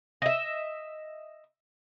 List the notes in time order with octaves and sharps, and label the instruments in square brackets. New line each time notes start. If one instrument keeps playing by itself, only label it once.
[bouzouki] D#5 E5